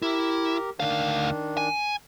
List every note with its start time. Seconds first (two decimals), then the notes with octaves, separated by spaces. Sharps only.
0.02 E4 G4 A#4
0.80 D2 D#3 D4 F5
1.57 G#5